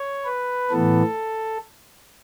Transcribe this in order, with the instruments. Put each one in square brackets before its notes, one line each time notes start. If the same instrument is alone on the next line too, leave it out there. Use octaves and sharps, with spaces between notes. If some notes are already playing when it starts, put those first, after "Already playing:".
Already playing: [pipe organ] C#5
B4
A2 E3 B3 A4